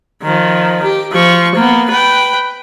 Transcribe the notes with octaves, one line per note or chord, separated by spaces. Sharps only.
D#3 F3
G4
F3 C#6
A#3 B3
B4 G5